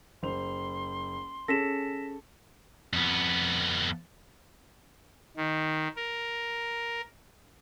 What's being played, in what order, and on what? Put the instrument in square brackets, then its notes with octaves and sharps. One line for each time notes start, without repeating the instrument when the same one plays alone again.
[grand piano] F#1 C5 F7 [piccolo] C6
[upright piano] C#4 G#4 [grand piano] A4 [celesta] A#6 B6 E7
[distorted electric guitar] F2 B3
[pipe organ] D#3
A#4